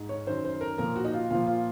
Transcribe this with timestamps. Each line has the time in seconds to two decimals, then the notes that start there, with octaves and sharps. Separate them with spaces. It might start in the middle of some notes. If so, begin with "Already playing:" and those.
Already playing: G#2
0.09 C#5
0.27 F#2 D#3 C5
0.45 C5
0.61 A#4
0.78 A#2 F3 A#4
0.96 F#4
1.05 D#4
1.14 F4
1.30 A#2 F3 F4
1.47 F4